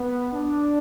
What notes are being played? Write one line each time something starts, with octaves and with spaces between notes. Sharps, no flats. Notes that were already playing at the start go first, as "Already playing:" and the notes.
Already playing: B3
D4